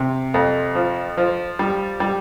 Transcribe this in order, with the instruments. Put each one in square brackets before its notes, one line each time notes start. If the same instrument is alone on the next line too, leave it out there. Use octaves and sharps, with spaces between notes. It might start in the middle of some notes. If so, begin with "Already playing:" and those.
Already playing: [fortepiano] C3
F2
F3
F3
G3
G3